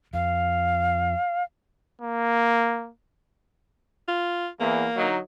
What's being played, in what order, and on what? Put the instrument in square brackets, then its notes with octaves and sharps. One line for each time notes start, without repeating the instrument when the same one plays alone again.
[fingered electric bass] F2 [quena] F5
[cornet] A#3
[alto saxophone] F4
[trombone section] E2 [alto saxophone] A#3
[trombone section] D3 F#3 D#4